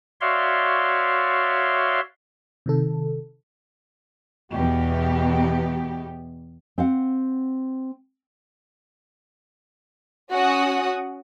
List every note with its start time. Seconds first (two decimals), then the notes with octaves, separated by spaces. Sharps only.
0.21 F#4 C#5 D5 E5 F5 C6
2.66 C3 D#3 A4
4.52 E2 B2 B3 G4
6.78 C4 F5 F#5
10.31 C#4 F#4 F#5 D#6